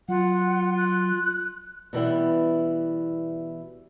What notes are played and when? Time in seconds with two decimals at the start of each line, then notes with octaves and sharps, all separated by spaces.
0.09 F#3 F4 F#5
0.77 F#6
1.93 B2 E3 G3 E4